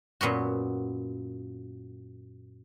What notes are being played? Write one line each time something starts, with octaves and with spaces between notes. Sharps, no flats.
F#2 A#2 B3 F#4